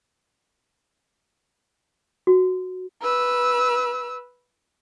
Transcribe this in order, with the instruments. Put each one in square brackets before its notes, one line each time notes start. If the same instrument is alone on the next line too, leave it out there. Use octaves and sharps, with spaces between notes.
[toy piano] F#4
[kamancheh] B4 E6